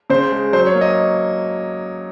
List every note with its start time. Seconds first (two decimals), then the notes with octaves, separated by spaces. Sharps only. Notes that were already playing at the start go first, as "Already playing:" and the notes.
0.10 C#3 C5
0.32 G#3
0.53 F#3 C5
0.67 C#5
0.75 A#3
0.81 D#5